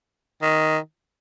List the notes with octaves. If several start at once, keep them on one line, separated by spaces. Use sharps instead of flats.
D#3